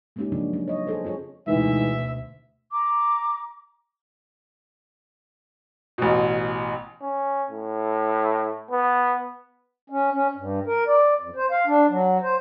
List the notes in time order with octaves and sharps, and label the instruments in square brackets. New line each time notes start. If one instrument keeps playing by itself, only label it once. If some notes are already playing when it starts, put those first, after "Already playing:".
[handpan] G#3 A#3 C4 C#4 D#4 G4
C#3 F3 F#3 A#3 C4 D4
F#3 C#4
C#5 D#5
G#4 A4 C5
C4 F4 G#4 C#5
[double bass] D2 B2 [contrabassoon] G#2 [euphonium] E3 [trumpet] E5
[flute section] A#5 D6
[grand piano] A1 B2
[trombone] C#4
A2
B3
[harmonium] C#4
C#4
G2
A#4
D5
F2
C5
F5
D4
F#3
C5